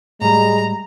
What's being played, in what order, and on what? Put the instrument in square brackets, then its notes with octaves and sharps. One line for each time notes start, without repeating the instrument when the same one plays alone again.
[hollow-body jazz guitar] A2 G3 [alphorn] G#3 [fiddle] A#5